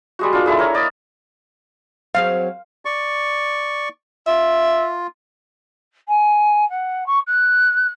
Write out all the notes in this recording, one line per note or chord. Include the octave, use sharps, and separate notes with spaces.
G3 G#3 F#4
A#3 D4 F4
G#3 E4 A4
A#4 C#5
A#3 D5 D#5
F#3 C4 G#4 F5
D5 C#6
F4 E5
G#5
F#5
C#6
F#6